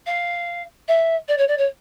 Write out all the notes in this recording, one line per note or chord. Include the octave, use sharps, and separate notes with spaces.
F5
E5
D5
C#5
D5
C#5